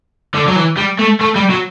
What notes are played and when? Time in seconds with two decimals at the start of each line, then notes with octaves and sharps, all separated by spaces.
0.34 D3
0.48 F#3
0.56 E3
0.77 G3
0.99 A3
1.21 A3
1.36 G3
1.50 F#3